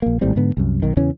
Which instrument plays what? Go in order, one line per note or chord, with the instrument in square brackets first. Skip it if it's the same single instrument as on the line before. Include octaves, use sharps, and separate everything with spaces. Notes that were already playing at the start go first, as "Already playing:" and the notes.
[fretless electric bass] A#1 A#3
G#1 A2 G3 C4
G#2 D3 B3
C2 F#2
B1 D#3
E2 C#3 E3 C#4